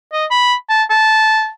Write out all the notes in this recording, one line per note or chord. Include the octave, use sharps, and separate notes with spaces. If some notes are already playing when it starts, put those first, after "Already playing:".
D#5
B5
A5
A5